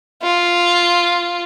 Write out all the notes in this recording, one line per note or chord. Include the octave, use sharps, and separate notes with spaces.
F4